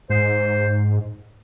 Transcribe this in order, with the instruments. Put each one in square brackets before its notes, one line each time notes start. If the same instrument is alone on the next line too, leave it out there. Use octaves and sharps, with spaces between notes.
[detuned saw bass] G#2 [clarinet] C5